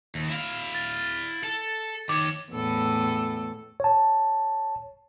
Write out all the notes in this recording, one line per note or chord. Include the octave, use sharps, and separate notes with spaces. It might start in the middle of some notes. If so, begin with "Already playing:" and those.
D#2
E4 F5
A6
A4
D#3 C#5 D6
E2 A2 A4
C#5 A5